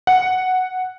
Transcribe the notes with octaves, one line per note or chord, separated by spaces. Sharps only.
F#5